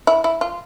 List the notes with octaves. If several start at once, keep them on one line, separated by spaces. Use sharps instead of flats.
E4
E4
F4